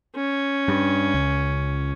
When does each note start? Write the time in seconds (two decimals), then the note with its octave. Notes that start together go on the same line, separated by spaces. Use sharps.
0.15 C#4
0.68 G2
1.14 C#2